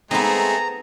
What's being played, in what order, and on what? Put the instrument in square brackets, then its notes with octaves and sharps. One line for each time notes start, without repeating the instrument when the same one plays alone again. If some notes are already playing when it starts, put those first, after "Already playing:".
[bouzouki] G#3 C4 [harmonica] A3 G#4 [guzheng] B3 D#4 [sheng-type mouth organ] A#5